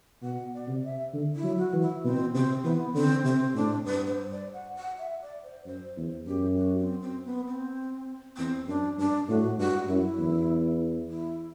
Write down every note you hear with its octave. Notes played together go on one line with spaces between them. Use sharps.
B2 F#5
D5
C3
E5
D3
E4
F#3
F#4
E3
E4
B2 C4
C3 C4
E3 B3
D3 C4
C3 C4
A2 D4
G2 B4
C5
D5
F#5
F#5
E5
D5
C5
F#2 C5
E2
F#2 G4
F#4
C4
C4
B3
C4
E2 C4
F#2 D4
G2 D4
A2 F#4
G2 F#4
F#2 E4
E2
E4